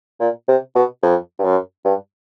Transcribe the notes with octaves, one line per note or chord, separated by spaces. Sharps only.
A#2
C3
B2
F2
G2
F#2
G2